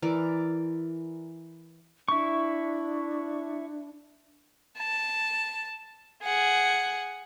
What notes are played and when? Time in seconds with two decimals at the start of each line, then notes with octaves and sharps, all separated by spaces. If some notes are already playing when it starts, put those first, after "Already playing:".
0.02 E3 A#4 D5
2.08 D4 E4 C#6
4.78 A5
6.24 G#4 F#5